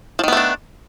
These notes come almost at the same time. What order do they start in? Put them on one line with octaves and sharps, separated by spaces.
F3 D#3 B3 A3 D4